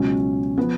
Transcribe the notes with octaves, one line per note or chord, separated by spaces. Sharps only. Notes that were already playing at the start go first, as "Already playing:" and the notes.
Already playing: C#2 B2 F#3 C#4
F3 B3